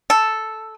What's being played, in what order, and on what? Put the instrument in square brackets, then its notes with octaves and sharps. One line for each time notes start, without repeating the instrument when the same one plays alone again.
[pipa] A4